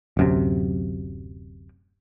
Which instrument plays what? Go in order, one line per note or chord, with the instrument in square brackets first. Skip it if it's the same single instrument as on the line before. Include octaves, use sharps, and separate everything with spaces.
[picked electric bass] D1 F#2 C3